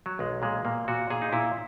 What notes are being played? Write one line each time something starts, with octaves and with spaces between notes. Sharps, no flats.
F#3
B1 G#3
A#2 G#3
A#2 A#3
A#2 F#4
A#2 G#4
D#4
A#2 E4